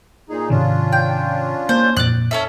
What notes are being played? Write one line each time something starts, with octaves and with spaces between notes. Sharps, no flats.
A#2 D#4 G#4
G#2 C3 D#3 C#4 D4 F4
G5
A#3 C5
F2 A#2 D5 F#6
C#4 A4 E5